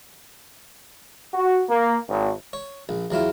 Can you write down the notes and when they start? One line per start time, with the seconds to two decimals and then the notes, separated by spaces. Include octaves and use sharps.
1.34 F#4
1.69 A#3
2.08 G#1
2.53 C#5
2.89 A#1
3.10 E2 F#3 E4 F4